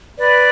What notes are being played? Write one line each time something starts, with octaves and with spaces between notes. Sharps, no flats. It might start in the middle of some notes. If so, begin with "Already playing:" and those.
B4 D5